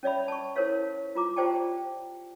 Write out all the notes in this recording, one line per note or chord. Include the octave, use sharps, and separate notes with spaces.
C#4 C#5 D5 E5 B5
A5 C#6
E4 A4 A#4 C5 C#5 F5
F4 A#5 D6
F4 G4 C5 D5 G5 A5